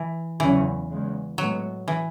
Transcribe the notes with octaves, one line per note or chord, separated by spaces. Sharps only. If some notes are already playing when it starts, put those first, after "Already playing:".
Already playing: E3
E2 C#3 E3 F#3 C#4
E2 C#3 G#3
A2 F#3 G#3 B3
E3